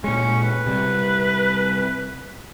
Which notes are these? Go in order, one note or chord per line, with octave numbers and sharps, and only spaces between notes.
A#2 G#3 C#4
B4
C3 G3